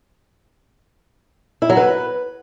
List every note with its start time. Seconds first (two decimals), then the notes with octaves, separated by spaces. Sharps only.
1.62 E4
1.69 F#3
1.77 B4